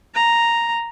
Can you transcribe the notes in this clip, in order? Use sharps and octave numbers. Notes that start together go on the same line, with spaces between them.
A#5